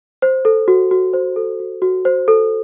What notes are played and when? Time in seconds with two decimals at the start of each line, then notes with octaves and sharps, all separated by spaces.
0.22 C5
0.45 A4
0.68 F#4
0.91 F#4
1.13 C5
1.36 A4
1.60 F#4
1.82 F#4
2.05 C5
2.28 A4